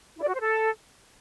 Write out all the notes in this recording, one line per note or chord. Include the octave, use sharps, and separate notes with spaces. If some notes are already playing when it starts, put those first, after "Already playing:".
E4
D5
F#4
C5
A4